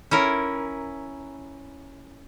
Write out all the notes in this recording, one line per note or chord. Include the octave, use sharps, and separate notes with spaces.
C#4 E4 A#4